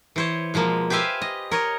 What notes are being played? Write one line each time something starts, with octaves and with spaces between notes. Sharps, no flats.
E3 C5 C#5
B2 F3 G#3 A#3
G4 B4 C5 E5 F5 G#5
D#5
A#4 C#5 D#5